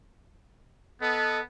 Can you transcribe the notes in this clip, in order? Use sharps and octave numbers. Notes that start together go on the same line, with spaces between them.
B3 A4 D#5